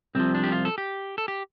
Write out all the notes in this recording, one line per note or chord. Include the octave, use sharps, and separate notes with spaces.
C2 C3 F3 C4
D4
G4
F4
A4
G4
A4
G4